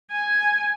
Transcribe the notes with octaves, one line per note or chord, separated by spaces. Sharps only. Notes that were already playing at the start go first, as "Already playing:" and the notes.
G#5